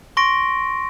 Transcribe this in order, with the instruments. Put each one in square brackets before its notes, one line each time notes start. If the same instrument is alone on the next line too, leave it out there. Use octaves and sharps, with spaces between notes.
[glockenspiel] C6 C#6 A#6 D7